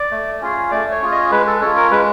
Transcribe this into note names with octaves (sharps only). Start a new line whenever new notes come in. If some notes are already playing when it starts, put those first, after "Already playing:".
Already playing: D5
A3
C#4 F4 G#4
A3 D5
C#5
C#4 F4 G#4
D#5
G#3 B4
A4
C#4 F4 A4
A#4
G#3 B4